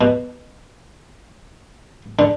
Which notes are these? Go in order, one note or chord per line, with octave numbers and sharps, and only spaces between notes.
B2
D3